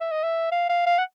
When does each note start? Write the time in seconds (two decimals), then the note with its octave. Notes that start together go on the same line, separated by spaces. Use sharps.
0.01 E5
0.12 D#5
0.23 E5
0.52 F5
0.69 F5
0.86 F5
0.99 F#5